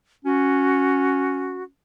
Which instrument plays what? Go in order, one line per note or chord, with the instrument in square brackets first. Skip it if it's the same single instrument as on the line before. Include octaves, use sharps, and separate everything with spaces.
[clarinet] C#4 [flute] F#4